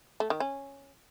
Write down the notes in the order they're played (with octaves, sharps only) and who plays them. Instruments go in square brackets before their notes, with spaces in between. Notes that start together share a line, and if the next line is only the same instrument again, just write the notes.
[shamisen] A3
D#3
C#4